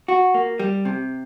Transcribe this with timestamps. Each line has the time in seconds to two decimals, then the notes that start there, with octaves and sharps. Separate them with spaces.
0.08 F#4
0.34 A#3
0.59 G3
0.85 C3